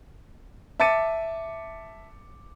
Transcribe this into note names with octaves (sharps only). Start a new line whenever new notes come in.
E5 A5 D6 A6 C#7 D#7